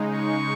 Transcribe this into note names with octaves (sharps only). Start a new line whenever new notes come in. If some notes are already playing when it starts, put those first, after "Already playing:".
Already playing: C#3 G#3 D#4
C#6